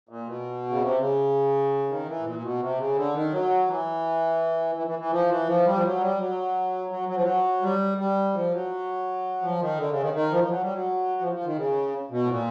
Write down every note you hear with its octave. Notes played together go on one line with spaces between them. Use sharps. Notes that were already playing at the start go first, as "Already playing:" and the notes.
A#2
B2
C#3
C3
C#3
D#3
E3
A2
A#2
B2
C3
C#3
D3
D#3
F#3
E3
E3
E3
E3
F3
E3
F3
G3
F3
F#3
G3
F#3
F#3
F#3
F3
F#3
G3
G3
F3
F#3
F3
D#3
D3
C#3
D#3
D#3
F3
F3
F#3
G3
F#3
F3
F3
D#3
C#3
B2
A2
A#2